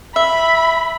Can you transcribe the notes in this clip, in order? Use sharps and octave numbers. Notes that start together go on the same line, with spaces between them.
E5 B5